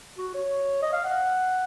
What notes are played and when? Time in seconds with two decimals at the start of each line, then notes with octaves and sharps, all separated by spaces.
0.18 F#4
0.34 C#5
0.82 D#5
0.93 F5
1.04 F#5